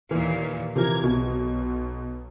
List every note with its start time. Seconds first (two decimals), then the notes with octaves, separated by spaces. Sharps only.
0.11 D#2 A#2 E3
0.76 C3 E3 F3 A#4 G#6
1.04 B1 B2